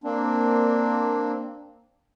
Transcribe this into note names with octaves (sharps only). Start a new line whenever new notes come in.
A#3 C4 D4